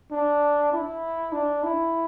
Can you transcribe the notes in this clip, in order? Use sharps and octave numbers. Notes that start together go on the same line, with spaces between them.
D4
E4
D4
E4